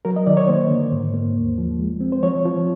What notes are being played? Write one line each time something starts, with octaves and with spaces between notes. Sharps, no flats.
F#3 A#4
D#5
D#3 D5
C#5
A#3 C5
D3
G#2
A#3
D#2
F3
G#3
C4
C5
F3 C#5
F3